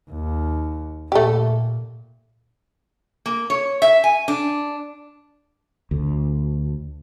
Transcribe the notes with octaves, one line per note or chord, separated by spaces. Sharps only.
D#2
A#2 A3 G4
A#3
C#5
E5
G#5
D4
D2